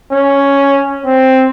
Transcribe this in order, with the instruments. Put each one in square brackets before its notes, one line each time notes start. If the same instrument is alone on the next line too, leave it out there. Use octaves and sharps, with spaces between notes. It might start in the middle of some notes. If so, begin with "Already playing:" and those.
[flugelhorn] C#4
C4